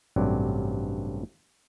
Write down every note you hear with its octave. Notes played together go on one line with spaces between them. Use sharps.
A1 G2 C3 F#3 D5